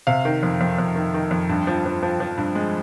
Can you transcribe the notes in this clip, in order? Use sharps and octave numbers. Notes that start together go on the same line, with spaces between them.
C3 F5
D#3
F2
F2
F2
D#3
D#3
F2
G2
F3
F3
F3
F3
G2
G#3